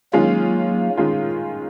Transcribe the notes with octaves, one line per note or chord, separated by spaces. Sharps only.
D#3 F#3 G#3 A#3 C#4 F4
D#3 G#3 C#4 F4